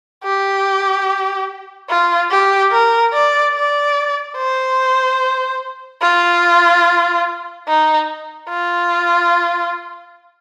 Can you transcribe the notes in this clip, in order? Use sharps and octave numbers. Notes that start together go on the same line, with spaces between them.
G4
F4
G4
A#4
D5
D5
C5
F4
D#4
F4